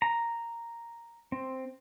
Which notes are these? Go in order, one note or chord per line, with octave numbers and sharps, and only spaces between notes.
A#5
C4